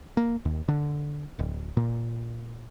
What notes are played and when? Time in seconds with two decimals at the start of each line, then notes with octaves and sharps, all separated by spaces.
0.17 A#3
0.45 D#2
0.68 D3
1.39 D1
1.77 A#2